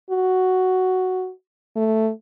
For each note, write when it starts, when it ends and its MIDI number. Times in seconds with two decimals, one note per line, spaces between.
0.10 1.31 66
1.76 2.10 57